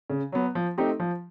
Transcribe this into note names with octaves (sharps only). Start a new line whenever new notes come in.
C#3
F#3 B3
F3
A3 C4 D#4 G4
F3